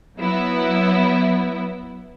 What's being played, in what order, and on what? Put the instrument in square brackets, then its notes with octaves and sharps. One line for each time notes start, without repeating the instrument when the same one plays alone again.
[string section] F#3 B3 E4